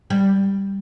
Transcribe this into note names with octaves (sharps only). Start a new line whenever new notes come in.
G3